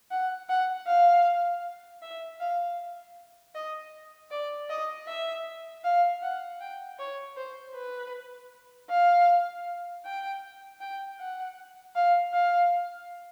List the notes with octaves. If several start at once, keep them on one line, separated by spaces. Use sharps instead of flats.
F#5
F#5
F5
E5
F5
D#5
D5
D#5
E5
F5
F#5
G5
C#5
C5
B4
F5
G5
G5
F#5
F5
F5